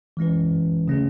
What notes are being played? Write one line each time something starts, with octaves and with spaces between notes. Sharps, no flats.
E3 G#3 C#4 E4 B4
C#3 F#3 A3 C#4 G#4